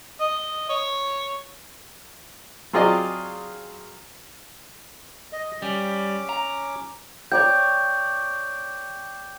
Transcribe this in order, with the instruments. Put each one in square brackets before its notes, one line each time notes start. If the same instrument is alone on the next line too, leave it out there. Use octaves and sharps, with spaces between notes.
[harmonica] D#5
C#5
[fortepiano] F#3 C4 F4 G#4 D5 D#5
[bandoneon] D#5
[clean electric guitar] G3 [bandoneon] C#4 D6
[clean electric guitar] A#5
[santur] C#5 D5 G5 [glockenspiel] G6